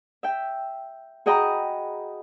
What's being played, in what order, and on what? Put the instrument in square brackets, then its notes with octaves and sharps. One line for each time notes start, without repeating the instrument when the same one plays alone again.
[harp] E5 G5
F#4 G#4 D#5 G5 A#5 B5